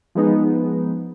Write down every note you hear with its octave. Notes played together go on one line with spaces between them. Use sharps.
F3 G#3 B3 D#4